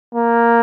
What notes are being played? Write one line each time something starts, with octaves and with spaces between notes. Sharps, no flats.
A#3